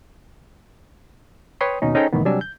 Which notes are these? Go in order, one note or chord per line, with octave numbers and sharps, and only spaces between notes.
B4 C#5 G5 C6 D#6
D#2 B2 C#4 D#4
C#4 D#4 G#4 A4 C5 G5
C2 A2 D#3 E3 B3
C3 F#3 G3 D4 G#5 E6
G6